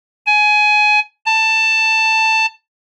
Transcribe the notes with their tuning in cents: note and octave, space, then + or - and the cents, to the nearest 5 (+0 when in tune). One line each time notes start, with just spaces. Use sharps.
G#5 +20
A5 +10